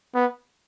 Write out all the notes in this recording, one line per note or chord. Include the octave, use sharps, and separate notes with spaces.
B3